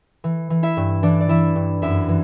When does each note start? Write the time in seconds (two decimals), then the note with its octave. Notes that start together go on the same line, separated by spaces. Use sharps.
0.24 E3
0.50 E3
0.63 E4 E5
0.77 G2
1.03 E3 D4 D5
1.21 D5
1.29 E3 E4 E5
1.55 G2
1.82 F#2 E4 E5
2.09 E3